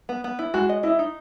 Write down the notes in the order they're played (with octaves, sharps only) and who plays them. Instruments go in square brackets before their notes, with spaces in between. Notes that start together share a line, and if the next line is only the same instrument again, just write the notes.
[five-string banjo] B3
B3
E4
[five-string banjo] G#3 [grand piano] F#4
[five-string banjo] D#5
[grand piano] E4 [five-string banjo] D#5
[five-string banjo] D#4